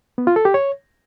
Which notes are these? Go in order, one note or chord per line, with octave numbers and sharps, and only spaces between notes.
B3
F4
A4
G4
C#5